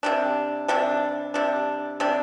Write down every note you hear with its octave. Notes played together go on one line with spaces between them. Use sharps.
C3 G3 D4
C3 G3 D4
C3 G3 D4
C3 G3 D4